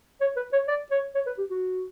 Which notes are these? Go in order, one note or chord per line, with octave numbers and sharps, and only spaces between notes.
C#5
B4
C#5
D5
C#5
C#5
B4
G4
F#4